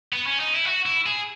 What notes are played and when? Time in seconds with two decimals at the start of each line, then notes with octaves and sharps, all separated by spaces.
0.13 B3
0.26 C#4
0.40 D#4
0.54 E4
0.66 F#4
0.86 E4
1.06 G#4